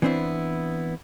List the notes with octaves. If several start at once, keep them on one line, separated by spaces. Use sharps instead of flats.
E3 B3 C4 D4 E4